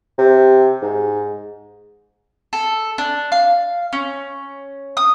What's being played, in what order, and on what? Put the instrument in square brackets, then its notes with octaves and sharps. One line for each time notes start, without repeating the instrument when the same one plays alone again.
[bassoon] C3
G#2
[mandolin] A4
D4
F5
C#4
D#6